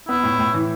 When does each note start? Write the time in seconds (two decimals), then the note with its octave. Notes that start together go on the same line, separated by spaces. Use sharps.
0.08 B3 E4
0.23 A2
0.39 A2
0.54 E3